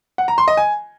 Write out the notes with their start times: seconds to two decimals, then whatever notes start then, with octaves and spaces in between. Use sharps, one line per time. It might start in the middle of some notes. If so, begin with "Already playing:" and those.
0.18 F#5
0.28 A#5
0.38 C6
0.48 D#5
0.57 G#5